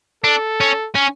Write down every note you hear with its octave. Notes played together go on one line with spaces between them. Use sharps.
D4 A4
C#4
C#4